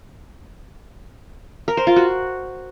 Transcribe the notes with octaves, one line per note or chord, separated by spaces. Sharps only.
A#4
C5
F4
F#4